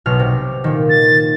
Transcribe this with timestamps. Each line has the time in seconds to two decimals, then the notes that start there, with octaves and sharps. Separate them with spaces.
0.06 B1 B2 F6
0.19 C3
0.64 A#2 D#3
0.90 A6